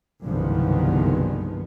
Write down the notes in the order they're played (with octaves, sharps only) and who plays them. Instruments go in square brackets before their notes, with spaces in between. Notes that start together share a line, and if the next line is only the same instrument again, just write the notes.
[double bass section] F#1 C2 G2 D#3 F3 B3